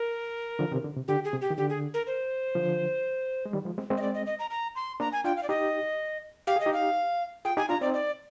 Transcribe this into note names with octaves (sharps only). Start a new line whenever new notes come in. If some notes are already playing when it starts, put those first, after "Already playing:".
Already playing: A#4
D3 F3
C3 D#3
D3
C3
D3 G4
G#4
C3
G4
D#3
D3 G4
G#4
A#4
C5
D3 F3
G#3
D#3 G3
F3 G#3
G#3 C4
G#3 C4
D#5
D5
D#5
D#5
A#5
A#5
C6
A#3 D4 A#5
G#5
D4 F4 G5
F5
D5
D#4 G4 D#5
G4 F5
G#4 D#5
D#4 G4
F5
F4 G#4 G5
D#4 G4 G#5
D4 F4 A#5
C4 D#4 D5
D5